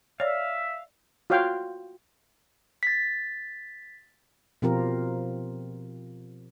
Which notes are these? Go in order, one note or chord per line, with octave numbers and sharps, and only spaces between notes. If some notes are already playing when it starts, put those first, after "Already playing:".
C#5 D5 E5 F5
F4 F#4 C#5 F5 G5
A6 B6
B2 F3 C4 F4 G4 A#4